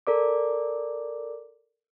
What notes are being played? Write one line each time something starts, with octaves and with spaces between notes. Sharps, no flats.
A4 A#4 D5 D6